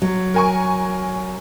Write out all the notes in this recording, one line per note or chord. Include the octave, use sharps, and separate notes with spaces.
F#3
A#4 G#5 C#6